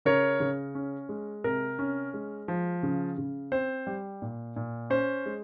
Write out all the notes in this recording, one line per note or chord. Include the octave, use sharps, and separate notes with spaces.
C#3 A#4 C#5
C#3
C#4
G#3
C3 A#4
C#4
G#3
F3
C#3
C#3
C4 C5
G3
A#2
A#2
C#4 C5
G#3